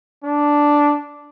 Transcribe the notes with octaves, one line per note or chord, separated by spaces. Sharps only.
D4